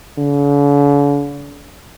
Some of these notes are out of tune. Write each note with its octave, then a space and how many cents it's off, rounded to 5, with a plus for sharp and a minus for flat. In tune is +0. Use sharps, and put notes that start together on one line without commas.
D3 -45